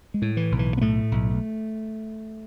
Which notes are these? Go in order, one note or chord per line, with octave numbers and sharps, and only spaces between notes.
G#3
A2
E3
B1
E3
B3
A2 A3
B1